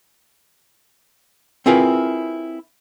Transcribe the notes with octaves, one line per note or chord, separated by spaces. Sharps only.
C4 E4 F4 G#4 A#4 B4